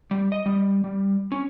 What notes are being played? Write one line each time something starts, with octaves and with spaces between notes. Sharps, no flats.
G3
D#5
G3
G3
C#4